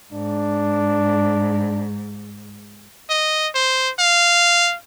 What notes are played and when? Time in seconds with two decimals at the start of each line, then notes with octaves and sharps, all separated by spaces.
0.13 G#2 D4
3.09 D#5
3.54 C5
3.99 F5